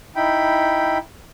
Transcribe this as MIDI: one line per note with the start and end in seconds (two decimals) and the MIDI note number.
0.16 0.98 63
0.16 0.98 64
0.16 0.98 79
0.16 0.98 83